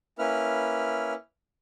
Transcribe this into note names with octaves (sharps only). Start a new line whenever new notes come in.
A#3 C#4 E4 B4 F6